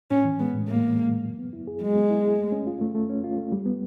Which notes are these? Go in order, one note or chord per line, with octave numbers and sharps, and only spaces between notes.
A2 C#4
E3
G#3 B3
A2
A2 A#3
E3
G#3
A2
F#3
B3
E4
G#4
F#3 G#3
B3
E4
G#4
A3
C#4
F4
A3
A3
C#4
F4
A3
G3
B3